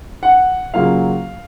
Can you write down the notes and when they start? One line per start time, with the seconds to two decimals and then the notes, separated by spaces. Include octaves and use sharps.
0.23 F#5
0.74 C#3 F#3 A#3 F4 F5